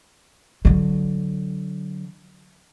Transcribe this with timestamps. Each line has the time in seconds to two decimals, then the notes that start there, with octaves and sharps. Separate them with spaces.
0.65 D3 F#3